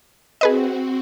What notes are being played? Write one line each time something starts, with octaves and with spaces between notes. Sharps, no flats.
C4 F#4 G#4 B4 D#5